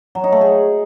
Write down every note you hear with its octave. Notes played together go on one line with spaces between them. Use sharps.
F#3
D#4
A3
G#4